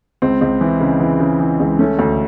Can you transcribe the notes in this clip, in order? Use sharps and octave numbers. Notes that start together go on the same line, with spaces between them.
C#2 C4
C#2
E3
C#3
E3
C#3
E3
C#2
A3 C#4
D2